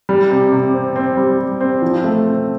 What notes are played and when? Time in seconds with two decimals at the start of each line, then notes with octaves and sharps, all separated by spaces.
0.09 G3
0.30 C3
0.52 C3
0.74 C4
0.96 C4
1.17 G3
1.39 G3
1.61 C4
1.82 F3
2.04 A3
2.25 C4